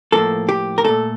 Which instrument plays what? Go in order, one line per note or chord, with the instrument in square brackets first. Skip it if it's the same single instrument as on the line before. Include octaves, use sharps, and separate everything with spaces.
[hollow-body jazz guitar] A2 F3 A#3 A4
G4
A#4
A#2 A3 A4